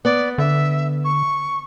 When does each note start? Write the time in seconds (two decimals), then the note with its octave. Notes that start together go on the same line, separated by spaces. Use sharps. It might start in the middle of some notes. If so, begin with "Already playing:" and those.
0.05 B3 D5
0.38 D3 E5
1.05 C#6